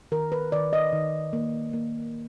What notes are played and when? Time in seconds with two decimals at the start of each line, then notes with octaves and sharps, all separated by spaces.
0.12 D#3 A#4
0.32 B4
0.52 D#3 D5
0.73 D#5
0.93 D#3
1.33 A#3
1.73 A#3